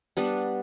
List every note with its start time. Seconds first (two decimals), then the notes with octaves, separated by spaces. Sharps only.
0.17 G3 B3 D4